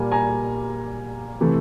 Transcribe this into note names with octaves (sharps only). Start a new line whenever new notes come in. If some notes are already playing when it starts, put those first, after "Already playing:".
Already playing: A#2 G3 A#3 G#5
G#5 A#5
C3 E3 A3